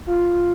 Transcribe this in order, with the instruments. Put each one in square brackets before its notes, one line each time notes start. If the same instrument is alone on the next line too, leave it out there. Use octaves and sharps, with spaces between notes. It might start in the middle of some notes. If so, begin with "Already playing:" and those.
[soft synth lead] F4